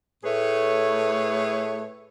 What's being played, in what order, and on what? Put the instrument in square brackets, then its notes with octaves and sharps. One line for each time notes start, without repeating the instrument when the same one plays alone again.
[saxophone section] A2 A3 G#4 B4 C#5